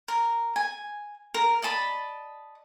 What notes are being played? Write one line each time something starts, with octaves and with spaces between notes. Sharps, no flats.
A#4
G#5
A#4
D5 D#5 A5 B5